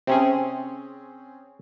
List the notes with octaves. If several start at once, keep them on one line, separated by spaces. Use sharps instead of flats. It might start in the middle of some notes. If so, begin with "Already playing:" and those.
C3 C4 C#4 G#4